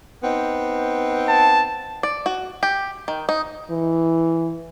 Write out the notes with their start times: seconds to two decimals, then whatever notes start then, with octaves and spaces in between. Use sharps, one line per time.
0.24 B3 C4 D#4
1.28 A5
2.03 D5
2.26 F#4
2.63 G4
3.08 D#3
3.29 D#4
3.70 E3